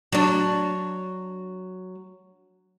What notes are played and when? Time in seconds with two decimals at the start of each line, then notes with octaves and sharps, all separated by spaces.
0.12 F#3 D4